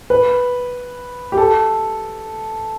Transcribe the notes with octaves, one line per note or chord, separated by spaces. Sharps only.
B4
G4
A4